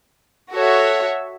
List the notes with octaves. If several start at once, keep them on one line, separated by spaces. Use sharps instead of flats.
F#4 A4 C#5 E5